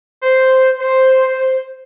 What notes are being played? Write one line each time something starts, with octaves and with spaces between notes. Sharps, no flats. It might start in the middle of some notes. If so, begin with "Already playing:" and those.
C5
C5